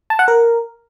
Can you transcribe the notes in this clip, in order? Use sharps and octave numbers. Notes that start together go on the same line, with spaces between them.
A5
F#5
A#4